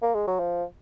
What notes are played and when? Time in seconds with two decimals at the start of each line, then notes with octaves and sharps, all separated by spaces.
0.02 A#3
0.14 G#3
0.27 F#3
0.40 F3